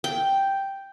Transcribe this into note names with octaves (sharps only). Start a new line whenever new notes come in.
G5